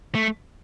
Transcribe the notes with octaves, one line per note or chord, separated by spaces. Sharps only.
A3